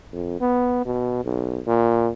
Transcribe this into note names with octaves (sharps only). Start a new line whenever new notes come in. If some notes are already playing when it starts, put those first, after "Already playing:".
F2
B3
B2
B1
A#2